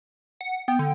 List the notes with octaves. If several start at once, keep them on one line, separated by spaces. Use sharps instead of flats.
F#5
B3 G5
D3